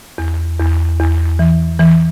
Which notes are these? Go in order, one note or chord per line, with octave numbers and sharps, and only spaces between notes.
E2
E2
E2
E3
E3